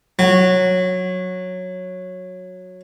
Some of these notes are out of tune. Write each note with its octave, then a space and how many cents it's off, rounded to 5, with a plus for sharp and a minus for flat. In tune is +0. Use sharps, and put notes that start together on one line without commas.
F#3 -15